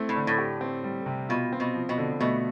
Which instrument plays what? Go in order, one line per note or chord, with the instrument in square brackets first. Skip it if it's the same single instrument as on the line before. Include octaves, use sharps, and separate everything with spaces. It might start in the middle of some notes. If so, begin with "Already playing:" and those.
Already playing: [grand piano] A3 C4 E4
[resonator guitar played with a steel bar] A2
[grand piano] D3
[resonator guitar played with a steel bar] A2
[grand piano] G4
C4
G3
C3
[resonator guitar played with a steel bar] B2 [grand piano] F4
[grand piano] C4
[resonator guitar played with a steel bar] B2
[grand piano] F3
[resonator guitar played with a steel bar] B2
[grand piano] D3
[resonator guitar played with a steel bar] B2 [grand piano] A3